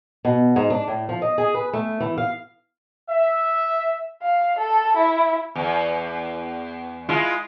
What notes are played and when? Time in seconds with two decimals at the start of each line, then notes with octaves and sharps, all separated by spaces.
0.25 B2
0.56 G#2
0.70 D4
0.88 A2
1.09 F3
1.22 D#5
1.38 G#4
1.54 B4
1.73 A3
2.00 E3
2.18 F5
3.08 E5
4.23 F5
4.59 A4
4.97 E4
5.55 E2
7.09 G#3 E4 F4